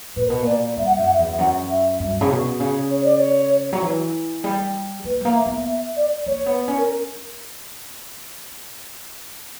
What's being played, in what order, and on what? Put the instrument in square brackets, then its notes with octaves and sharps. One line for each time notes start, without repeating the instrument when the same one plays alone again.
[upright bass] A#2 [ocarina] B4
[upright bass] B2 [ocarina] A#4
[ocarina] B4
[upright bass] A#2 [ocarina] D5
[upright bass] G2 [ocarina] E5
[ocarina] F#5
[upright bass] F#2 [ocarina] E5
[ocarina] F#5
E5
[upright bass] E2
[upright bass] F#2 [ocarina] F#5
[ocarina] E5
[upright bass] G2
C#3
B2
C#3
[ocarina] C#5
D5
C#5
[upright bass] F#3
E3
G3
[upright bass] A#3 [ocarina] B4
[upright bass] G3
A#3
[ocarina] E5
[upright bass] B3
[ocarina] E5
D5
[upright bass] A#3 [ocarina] C#5
[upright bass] B3
C#4
[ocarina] A#4